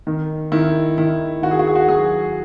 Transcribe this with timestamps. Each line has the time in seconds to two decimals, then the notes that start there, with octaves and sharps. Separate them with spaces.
0.07 D#3
0.52 D#3 E4
0.98 D#3 E4
1.42 D#3 F#4
1.51 G#4
1.59 F#4
1.67 G#4
1.76 F#4
1.89 F#3 G#4